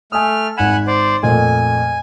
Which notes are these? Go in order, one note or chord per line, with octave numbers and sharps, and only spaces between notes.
A3 G#5 D#6 F6
G#1 F#5 G#5 B5 E7
C5 D5
F2 A#2 A3 G#5